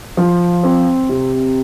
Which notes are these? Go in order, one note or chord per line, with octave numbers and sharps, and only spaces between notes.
F3
C4
C3